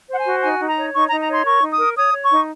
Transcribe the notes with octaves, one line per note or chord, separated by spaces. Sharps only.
C5 F#5
G#5
F#4
D#4 G#5
D#4
A#5
C#5
D#4 C#6
A#5
D#4
A#5
C#5 C6
A#4 C#6
D#4
D#6
A#4
C#5 D#6
C#5
C#6
D#4